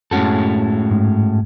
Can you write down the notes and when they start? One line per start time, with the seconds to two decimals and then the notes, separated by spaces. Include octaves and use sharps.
0.11 F#2 A2 G#3 C#4 F#4 A4
0.91 G#2